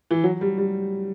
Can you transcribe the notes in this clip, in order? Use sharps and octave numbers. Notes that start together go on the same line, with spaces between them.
E3
F#3
G3
G3